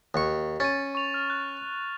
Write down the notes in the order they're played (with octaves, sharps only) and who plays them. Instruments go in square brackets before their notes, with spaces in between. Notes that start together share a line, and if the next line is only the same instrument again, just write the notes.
[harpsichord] D#2 C#6
[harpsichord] C#4 [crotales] A6 D#7
[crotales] C#6 F7
F6
F#6